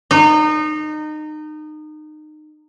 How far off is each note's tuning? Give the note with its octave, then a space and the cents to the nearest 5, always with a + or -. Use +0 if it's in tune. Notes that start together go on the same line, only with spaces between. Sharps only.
D#4 -25